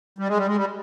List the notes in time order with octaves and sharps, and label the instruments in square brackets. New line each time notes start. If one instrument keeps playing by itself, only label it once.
[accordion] G3
G#3
G3
G#3
G3